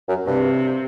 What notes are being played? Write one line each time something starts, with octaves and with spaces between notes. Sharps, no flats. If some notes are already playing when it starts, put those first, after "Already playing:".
F#2
G2 C3